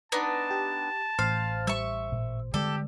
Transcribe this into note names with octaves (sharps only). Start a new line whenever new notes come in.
B3 D4 D#4 A5
G4
A1 C5 F5
G3 E5 C#6
A#2
D3 G3 G#3 G4 A4 D5